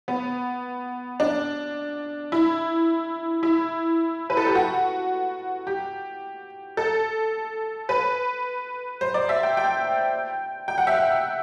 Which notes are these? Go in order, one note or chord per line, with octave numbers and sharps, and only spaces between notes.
B3
D4
E4
E4
B4
A4
G4
F#4
G4
A4
B4
C5
D5
E5
G5
G5
G5
F#5
E5
F#5